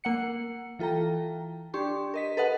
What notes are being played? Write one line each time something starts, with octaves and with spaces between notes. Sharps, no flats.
A#3 F#5 C#7
E3 F4 A4 G5 A#5
D4 G4 C6 C#6
A#4 D#5 B6
A4 B4 D#5 F#5